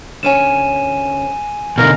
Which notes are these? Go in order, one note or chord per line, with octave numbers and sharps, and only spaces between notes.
D2 C#4 C#5 G#5 D#7 E7
B2 D3 D#4 A#4 F5 F#5